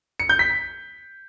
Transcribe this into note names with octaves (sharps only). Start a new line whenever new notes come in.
C#7
G6
B6